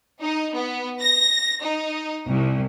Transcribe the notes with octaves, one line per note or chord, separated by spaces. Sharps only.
D#4
B3
A#6
D#4
C2